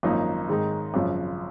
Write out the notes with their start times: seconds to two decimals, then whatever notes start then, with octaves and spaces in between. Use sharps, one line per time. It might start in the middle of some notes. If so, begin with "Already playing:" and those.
0.03 G#1 F#2 F3 A#3 D#4
0.49 G#2 D#3 G#3 D#4
0.94 G#1 F#2 C#3 F3